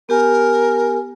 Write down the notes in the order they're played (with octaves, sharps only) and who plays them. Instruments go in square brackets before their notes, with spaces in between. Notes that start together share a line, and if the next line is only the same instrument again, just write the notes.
[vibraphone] B3 G4 G#5 [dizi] A#4